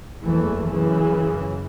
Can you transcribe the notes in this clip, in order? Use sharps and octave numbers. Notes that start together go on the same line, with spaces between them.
F#1 E2 E3 A3
F#2 C#3 E3